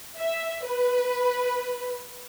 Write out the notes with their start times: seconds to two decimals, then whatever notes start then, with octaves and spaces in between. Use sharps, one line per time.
0.18 E5
0.65 B4